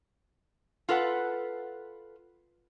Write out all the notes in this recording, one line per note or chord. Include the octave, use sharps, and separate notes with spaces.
F4 A4 B4 F#5